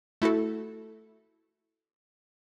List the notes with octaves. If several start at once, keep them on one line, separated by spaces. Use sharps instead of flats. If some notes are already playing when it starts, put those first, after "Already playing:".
A3 E4 F#4 A4